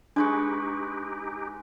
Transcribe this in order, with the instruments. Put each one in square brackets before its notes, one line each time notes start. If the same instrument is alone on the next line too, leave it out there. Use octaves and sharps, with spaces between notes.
[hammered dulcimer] G#3 B4 C#6 [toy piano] D4 [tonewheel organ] D#4 G4